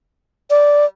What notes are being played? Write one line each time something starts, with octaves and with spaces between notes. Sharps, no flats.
D5